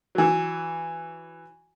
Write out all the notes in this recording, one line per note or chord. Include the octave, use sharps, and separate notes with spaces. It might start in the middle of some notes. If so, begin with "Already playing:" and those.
E3 F#3